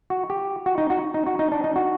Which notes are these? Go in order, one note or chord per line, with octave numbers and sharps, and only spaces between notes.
F#4
G4
F#4
D#4
F#4
D#4
F#4
D#4
D4
D#4
F#4